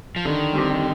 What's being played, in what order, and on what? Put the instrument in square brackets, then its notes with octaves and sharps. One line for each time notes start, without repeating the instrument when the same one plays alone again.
[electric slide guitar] F3
[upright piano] D3 [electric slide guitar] D#3
[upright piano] G3 C4 G4